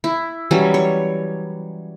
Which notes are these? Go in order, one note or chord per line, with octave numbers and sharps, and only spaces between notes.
E4
E3 F#3 G3 C#4
C#5